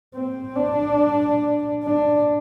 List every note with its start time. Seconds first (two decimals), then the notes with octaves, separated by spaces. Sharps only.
0.15 C4
0.56 D4
1.84 D4